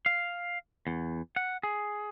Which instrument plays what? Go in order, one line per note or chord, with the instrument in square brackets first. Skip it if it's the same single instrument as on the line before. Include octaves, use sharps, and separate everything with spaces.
[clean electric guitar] F5
E2
F#5
G#4